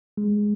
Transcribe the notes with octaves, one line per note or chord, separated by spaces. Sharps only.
G#3